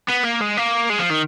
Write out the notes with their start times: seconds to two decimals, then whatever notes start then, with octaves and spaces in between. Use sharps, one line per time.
0.10 B3
0.25 A#3
0.41 G#3
0.57 A#3
0.90 G#3
1.00 F3
1.11 D#3